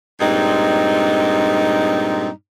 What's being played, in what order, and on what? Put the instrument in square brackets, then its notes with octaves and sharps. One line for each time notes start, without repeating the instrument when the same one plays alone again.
[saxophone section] G2 A#2 G#3 C4 D#4